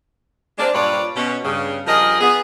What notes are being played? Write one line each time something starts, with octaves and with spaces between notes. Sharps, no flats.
G#3 A#3 C4 D4
G2 A#2 F4 B4 C#5 D5
B2 C#4
G2 C#3
G2 F3 G#4 A#4 D#5
B3 G#4